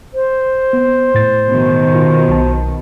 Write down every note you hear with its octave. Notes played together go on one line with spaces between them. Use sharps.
C5
B3
A2 A6
B2 D#3
F4
B1 A5